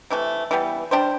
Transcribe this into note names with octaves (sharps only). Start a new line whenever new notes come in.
C3 E3 A3
E3 G3 B3
G3 D4 G4 C5